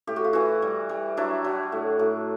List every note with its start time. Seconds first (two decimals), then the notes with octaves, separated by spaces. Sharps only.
0.07 A2 G4
0.16 F#4
0.24 F4
0.33 E3 E4 F#4
0.62 G3
0.89 G3
1.17 F#3 D4 E4
1.44 F#3
1.72 A2
1.99 A2